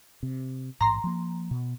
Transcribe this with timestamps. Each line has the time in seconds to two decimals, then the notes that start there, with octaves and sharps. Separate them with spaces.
0.23 C3
0.81 A1 G#2 A#5 C6
1.04 F3 A#3
1.51 B2